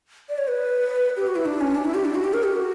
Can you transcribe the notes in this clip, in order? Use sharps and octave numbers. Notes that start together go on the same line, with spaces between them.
D5
C#5
B4
G4
F#4
E4
D4
C#4
D4
E4
G4
D4
F#4
G4
A#4
G4
F#4